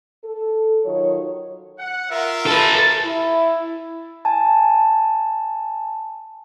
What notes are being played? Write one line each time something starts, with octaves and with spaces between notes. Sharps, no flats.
A4
D#3 F#3 F4 C#5
F#5
F4 A#4 E5
A4 B4
E4
G#5 A5